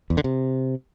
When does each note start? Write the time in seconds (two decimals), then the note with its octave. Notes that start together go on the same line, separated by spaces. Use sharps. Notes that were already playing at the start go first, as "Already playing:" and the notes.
0.10 E2
0.17 D3
0.24 C3